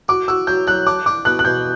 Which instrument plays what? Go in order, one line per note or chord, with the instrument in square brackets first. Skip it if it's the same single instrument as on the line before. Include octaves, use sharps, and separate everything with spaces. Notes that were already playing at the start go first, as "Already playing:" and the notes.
[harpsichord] F#4 [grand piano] D6
[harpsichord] F#4 [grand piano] E6
[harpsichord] F#3 [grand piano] G6
[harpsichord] F#3 [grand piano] F#6
[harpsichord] D4 [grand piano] D6
[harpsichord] D4 [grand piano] D6
[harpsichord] B2 [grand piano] F#6
[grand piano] F#6
[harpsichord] B2 [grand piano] G6